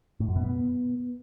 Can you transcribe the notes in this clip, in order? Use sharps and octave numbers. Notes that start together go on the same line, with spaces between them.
A2
F#2
B2
B3